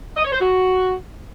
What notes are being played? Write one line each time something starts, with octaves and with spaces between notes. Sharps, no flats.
D#5
C#5
C5
F#4